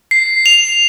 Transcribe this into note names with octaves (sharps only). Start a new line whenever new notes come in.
C7
F7